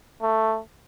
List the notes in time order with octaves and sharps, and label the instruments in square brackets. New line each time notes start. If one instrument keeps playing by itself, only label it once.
[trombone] A3